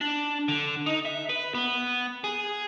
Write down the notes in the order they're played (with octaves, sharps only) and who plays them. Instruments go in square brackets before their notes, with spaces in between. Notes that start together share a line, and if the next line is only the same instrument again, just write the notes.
[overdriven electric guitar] D4
D3
D#4
E5
B4
B3
G#4